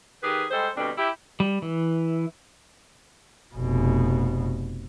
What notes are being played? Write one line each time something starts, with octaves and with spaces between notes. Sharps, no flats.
D#3 G4 G#4 B4
G3 G#3 A4 C5
D2 B2 G3 C4 D4
E4 G4
G3
E3
F1 B2